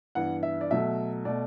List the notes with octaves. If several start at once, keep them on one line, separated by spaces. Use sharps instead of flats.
G2 E3 B3 F#5
E5
D5
B2 F#3 A3 E5
B2 A3 D5